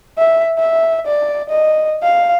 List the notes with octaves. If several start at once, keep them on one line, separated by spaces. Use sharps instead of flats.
E5
E5
D5
D#5
F5